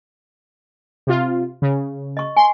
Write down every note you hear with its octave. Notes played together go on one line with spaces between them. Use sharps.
C3 F4
C#3
D#5 C#6
G#5 C6